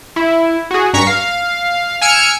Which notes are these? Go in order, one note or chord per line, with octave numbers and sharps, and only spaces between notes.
E4
F#4 G#4
G2 A#5 C#6 B6 C#7
F5
G#5 E6 F6 C#7 D7